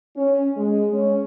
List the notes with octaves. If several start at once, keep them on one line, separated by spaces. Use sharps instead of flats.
C#4
G#3
C#4